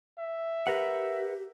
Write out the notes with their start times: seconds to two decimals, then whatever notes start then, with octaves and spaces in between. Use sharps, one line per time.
0.18 E5
0.67 G4 A#4 B4 F#5